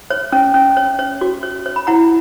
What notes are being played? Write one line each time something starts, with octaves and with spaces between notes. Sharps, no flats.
C#5
C#4
C#4
C#5
C#5
F#4
C#5
C#5
B5
E4 F#5 A#5